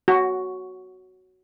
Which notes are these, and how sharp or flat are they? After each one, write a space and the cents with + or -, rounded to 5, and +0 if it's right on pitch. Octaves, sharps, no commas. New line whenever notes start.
F#4 +5